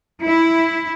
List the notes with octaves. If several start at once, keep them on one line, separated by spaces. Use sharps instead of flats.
E4